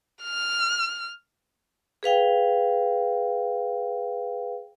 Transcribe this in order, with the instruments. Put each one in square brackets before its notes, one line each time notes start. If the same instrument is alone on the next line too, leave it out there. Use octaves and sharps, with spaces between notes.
[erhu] F6
[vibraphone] G#4 B4 F5 G5